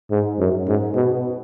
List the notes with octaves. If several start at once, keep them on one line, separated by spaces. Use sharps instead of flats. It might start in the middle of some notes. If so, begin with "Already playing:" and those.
G#2
F#2
G#2
B2